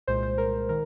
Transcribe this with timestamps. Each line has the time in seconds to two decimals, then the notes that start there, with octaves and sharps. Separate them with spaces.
0.07 C2 A#2 G#3 C5
0.23 C5
0.38 A#4
0.69 D#3 A#4